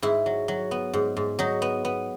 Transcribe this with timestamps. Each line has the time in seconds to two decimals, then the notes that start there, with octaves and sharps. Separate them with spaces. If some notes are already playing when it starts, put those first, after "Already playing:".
0.02 G#2 E4
0.26 F#3
0.48 F#3
0.71 B3
0.93 G#2
1.17 G#2
1.39 F#3 D#4
1.62 B3
1.85 B3